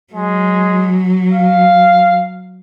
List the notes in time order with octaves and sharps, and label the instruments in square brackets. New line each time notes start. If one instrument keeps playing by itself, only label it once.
[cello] F#3 [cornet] G#3
[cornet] F5